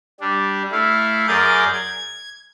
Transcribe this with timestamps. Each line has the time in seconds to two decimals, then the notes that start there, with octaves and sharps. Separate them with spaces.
0.21 G3 D4
0.72 A3 E4 F5
1.28 F#2 G#4 A#4 D5 G6 A6
1.73 G#6